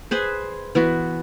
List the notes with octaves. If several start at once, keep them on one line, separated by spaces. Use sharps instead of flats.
G#4 B4 C5
E3 B3 F#4